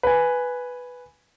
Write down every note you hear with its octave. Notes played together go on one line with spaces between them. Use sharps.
B4 G#5